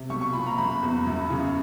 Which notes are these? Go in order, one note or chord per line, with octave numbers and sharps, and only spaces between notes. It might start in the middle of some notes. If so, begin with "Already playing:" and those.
Already playing: C3
B1 C#6
C#6
A#2 B5
A#5
F#1 B5
E2
F#2
C#3